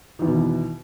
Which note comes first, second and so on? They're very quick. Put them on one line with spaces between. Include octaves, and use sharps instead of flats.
D#3 E2 E3 B2